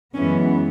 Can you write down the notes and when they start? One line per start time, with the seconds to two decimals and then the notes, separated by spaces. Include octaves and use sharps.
0.14 F#2 E3 G#3 B3 C#4